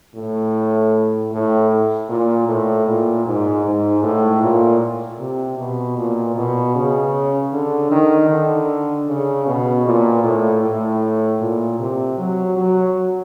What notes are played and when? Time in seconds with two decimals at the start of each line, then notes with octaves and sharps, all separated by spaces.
0.15 A2
1.32 A2
2.09 A#2
2.48 A2
2.87 A#2
3.26 G#2
3.65 G#2
4.03 A2
4.42 A#2
5.19 C3
5.58 B2
5.98 A#2
6.36 B2
6.75 C#3
7.53 D3
7.91 D#3
8.30 D3
9.08 C#3
9.47 B2
9.86 A#2
10.24 A2
10.63 A2
11.40 A#2
11.79 C3
12.18 F#3
12.57 F#3